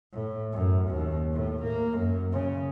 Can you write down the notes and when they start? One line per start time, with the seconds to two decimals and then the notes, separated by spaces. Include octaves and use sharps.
0.13 A2
0.53 F#2
0.89 D#2
1.33 A2
1.62 A#3
1.98 F#2
2.32 C#3